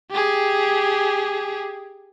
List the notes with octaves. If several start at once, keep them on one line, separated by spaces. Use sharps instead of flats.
G4 G#4